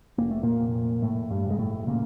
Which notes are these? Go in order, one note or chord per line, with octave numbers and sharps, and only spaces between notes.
F1 A#3
A3
A#2 A#3
F1
F1 A2 A3
G2 G3
F1
G#3
A2 A3
A#2 C#3 A#3